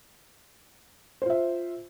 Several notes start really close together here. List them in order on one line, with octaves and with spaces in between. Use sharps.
C5 F4 E5